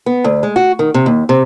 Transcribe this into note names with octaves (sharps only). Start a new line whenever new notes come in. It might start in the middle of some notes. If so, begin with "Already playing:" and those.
B3
D2
G#3
F#4
D#3
C3
D#2
C3